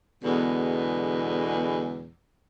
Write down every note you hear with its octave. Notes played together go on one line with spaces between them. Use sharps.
E2 B2 D3 G#3